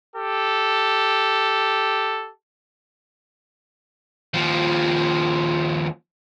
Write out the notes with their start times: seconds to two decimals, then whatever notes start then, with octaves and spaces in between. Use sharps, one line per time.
0.16 G4 A4
4.34 D#2 F3